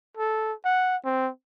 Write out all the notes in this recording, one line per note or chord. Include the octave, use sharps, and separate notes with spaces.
A4
F#5
C4